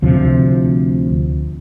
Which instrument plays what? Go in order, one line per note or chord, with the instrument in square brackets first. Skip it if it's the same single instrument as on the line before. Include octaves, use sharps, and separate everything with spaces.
[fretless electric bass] D2 C3 F3